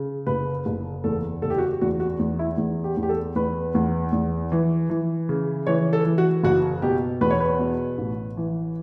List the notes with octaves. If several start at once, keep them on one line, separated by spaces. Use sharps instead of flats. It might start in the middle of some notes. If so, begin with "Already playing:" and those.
Already playing: C#3
F#1 B4
F#1
E2 A4
F#1 A4
G4
F#4
G4
E2 F#4
F#4
E2
E4
E2
G4
E2
G4
A4
E2 B4
E2
E2
E3
E3
C#3
E3 C#5
A4
E3
F#4
F#1 F#4
B2 G4
E2 B4
C#5
B4
B2
A1
E3